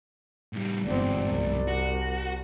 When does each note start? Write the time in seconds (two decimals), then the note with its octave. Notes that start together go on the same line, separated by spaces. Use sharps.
0.53 A2 G3
0.85 G1 E2 G#2 C4 D5
1.27 C2
1.67 F#4